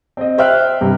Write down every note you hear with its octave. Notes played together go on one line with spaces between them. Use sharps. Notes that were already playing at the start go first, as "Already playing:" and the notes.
C4 D#5
C5 E5 G5 F6 F#6
G2 C3